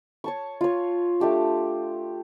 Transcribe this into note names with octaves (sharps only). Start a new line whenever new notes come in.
C#5 A5 C#6
F4 C#5
A3 D4 G4 A5